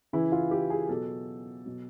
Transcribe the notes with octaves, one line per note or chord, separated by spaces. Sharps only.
C#3 E3 E4
F4
G4
G#4
B2 F#3 A4
B2 F#3